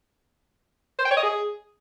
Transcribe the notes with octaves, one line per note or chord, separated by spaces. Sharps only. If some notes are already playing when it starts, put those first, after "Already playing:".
C5
G5
C#5
D#5
G#4